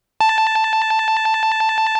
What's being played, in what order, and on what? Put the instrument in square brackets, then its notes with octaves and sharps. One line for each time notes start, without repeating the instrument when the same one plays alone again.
[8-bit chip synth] A5